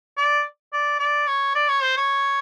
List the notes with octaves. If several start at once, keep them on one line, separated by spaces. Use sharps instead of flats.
D5
D5
D5
C#5
D5
C#5
C5
C#5